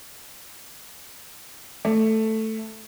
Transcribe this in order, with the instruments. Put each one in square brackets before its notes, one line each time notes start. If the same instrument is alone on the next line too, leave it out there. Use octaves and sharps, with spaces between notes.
[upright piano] A3